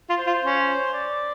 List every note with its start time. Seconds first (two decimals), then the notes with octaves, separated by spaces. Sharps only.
0.10 F4
0.18 C5
0.27 F4
0.43 C#4
0.93 D5